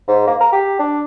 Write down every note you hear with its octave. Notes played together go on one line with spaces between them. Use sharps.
G#2
A#3
A#4
G4
D4